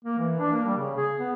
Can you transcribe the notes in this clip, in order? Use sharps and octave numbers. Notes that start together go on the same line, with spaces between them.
A#3
E3
D4
A#3
G3
C#3
G#4
B3